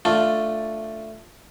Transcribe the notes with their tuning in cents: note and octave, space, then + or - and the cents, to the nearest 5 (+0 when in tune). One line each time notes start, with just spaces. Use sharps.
A3 +5 D4 +0 F4 +0